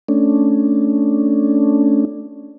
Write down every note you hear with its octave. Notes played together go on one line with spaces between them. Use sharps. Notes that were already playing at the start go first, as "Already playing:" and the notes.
A3 C#4 D4